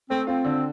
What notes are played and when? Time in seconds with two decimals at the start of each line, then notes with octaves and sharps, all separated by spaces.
0.10 A3 C4
0.27 C4 F4
0.45 D3